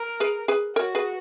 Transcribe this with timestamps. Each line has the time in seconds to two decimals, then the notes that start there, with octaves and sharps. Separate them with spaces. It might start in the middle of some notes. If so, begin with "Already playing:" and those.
Already playing: A#4
0.20 G#4 B4
0.48 G#4 B4
0.76 F#4 A#4 C#5
0.95 G#4 B4